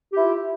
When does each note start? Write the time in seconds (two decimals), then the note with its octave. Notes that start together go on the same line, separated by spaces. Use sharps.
0.11 G4
0.15 E4
0.20 F4